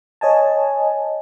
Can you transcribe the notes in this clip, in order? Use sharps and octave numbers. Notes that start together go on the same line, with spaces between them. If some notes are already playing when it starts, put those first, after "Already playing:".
C#5 D#5 G#5 A5